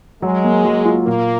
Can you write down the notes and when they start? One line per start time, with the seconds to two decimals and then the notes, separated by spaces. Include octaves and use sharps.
0.22 F#3 G#3
0.44 A#3
0.65 F#3
0.85 F4
1.06 A#2 A#3